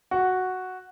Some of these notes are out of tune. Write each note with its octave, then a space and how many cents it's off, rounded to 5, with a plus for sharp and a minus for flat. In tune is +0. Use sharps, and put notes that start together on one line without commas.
F#4 +0